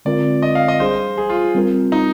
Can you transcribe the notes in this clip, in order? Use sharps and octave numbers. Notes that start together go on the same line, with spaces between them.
D3 G#3 C4 F4 A#4 D5
D#5
F5
D#5
G3 D4 G#4 C5
G#4
F4
G3 C4 F4 A#4
D#4